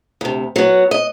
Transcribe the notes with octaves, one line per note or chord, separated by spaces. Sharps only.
D2 C3
F#3 B3
D#5